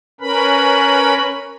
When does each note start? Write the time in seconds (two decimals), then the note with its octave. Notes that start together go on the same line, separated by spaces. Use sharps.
0.21 C#4 A#4 B4 B5